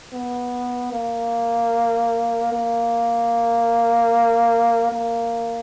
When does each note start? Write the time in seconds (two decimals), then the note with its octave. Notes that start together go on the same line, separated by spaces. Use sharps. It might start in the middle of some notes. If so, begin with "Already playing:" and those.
0.12 B3
0.93 A#3
2.52 A#3
4.92 A#3